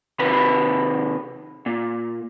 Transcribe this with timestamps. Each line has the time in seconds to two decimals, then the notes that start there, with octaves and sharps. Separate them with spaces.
0.19 C3 D#3 A#4 B4 B5
1.66 A#2